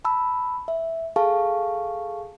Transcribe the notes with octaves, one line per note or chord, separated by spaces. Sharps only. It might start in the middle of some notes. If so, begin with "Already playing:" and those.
A5 B5 E6
E5
G#4 A4 F5 A5 C#6